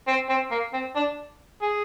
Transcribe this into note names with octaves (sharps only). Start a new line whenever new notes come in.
C4
C4
A#3
C4
D4
G#4